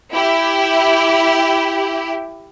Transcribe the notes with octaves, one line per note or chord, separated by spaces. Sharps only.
E4 G4